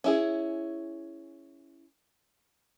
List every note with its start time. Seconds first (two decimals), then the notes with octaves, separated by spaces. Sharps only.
0.04 C#4 E4 G#4